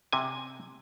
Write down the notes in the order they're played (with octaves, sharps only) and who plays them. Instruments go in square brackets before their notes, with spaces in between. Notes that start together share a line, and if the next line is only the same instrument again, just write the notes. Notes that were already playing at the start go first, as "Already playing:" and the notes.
[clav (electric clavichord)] C3 G#5